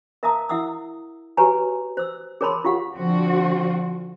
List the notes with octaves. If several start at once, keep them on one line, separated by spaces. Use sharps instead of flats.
A#4 E5 F5 A5 A#5 D#6
E4 E5 F#5 D#6 E6
F#4 G4 B4 C#5 G#5 A#5
C5 E6
G#4 A#4 C#5 A5 B5 C6
F4 G4 F5 F#5
D3 F3 C4 F#4